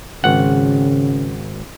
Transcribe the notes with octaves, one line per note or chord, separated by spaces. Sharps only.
G#1 C#3 F#5